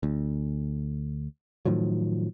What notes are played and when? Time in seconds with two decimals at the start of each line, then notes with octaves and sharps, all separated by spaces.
0.03 D2
1.65 A2 D#3 F3 F#3